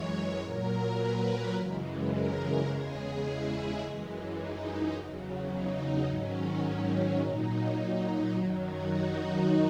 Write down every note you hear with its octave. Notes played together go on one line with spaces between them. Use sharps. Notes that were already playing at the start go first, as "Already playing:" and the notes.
Already playing: F#2 E3 G#3 C#5
A#2 F#3 A#4
B4
F#2 C#3 E3 G#3
A#4
A#4
E2 C#3 G#3 G#4
E4
F#2 E3 G#3
D#4
E2 C#3 F#3
D#4
G#2 D#3 F#3 C#4
A#2 F#3 D#4
F#2 D#3 F#3 E4
F#4
D#4